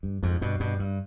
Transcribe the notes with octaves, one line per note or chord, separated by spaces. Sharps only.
G2
F2 G#2
G2 B2
G2 B2
G2